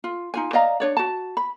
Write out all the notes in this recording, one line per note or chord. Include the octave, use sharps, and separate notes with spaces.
F4
D#4 F4 G#5
D5 D#5 F5 A#5
D4 C#5 D5
F#4 A5
B5